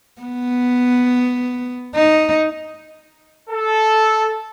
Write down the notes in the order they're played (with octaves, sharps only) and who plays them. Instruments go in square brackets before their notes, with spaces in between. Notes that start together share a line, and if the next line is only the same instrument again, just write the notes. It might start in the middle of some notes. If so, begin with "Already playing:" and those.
[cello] B3
D#4
[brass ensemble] A4